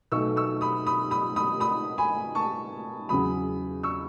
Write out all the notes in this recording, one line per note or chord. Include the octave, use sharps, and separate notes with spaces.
B1 B2 A3 C#6 E6
C#6 E6
B5 D#6
B5 D#6
B5 D#6
B5 D#6
B5 D#6
G#5 B5
A5 C#6
E2 C#3 F#3 B5 D#6
C#6 E6